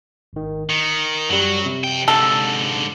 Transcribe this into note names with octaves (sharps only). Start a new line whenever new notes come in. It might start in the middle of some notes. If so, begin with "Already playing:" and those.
G#1 D#3
D#3 C#7
F#2 F#3 G3
C3
F2 G5
G#2 D3 A4